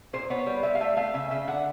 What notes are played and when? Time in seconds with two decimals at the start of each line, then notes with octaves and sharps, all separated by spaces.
0.13 A#2 C5
0.30 B3 C#5
0.46 G3
0.63 G3 E5
0.75 F5
0.81 A3 E5
0.97 A3 F5
1.14 C#3 E5
1.31 C#3 E5
1.47 D3 F#5